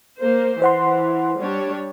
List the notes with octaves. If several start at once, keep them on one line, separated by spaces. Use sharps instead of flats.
A#3 C5
E3 C5 F#5 C6
G3 D4 C#5